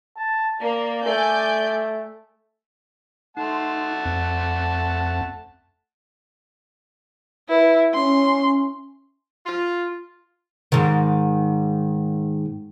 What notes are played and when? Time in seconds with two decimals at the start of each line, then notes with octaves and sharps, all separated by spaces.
0.17 A5
0.61 A#3 D5
1.06 A3 D5 G#5 G6
3.37 A3 D#4 F#5 A5 C6
4.05 F2 C4
7.49 E4 B4
7.94 C#4 C6
9.47 F4
10.72 G#2 D#3